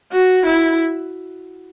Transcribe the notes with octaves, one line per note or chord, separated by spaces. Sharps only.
F#4
E4